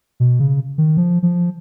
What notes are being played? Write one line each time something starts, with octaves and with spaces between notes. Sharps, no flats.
B2
C#3
D#3
F3
F3